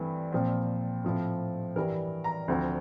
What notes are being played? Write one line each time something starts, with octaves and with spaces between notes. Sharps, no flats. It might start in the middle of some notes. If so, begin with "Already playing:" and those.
Already playing: G2 E3 A3 C4
A#2 F3 C4
A2 F3 C4
G2 E3 G3 A#4
A#5
D2 D3 F3 C4